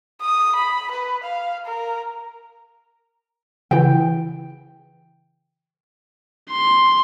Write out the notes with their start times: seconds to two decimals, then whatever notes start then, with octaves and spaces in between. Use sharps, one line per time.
0.21 D#6
0.55 B5
0.91 B4
1.24 F5
1.65 A#4
3.71 C#3 E3 E4 G5
6.51 C6